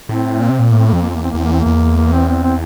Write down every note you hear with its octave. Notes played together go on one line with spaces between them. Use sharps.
A2 C4
A#2
C3
A#2
A2 A#3
C4
A#3
F2 C4
A#3
C4
E2 A#3
C4
A#3
E2 C4
A#3
C4
A#3
E2
A#3
C4
C4
C4